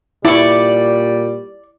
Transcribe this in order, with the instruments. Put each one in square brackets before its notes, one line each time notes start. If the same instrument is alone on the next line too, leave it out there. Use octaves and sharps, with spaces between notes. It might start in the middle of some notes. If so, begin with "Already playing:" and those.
[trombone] A#2 [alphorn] G3 [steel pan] E4 [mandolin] D5 C#6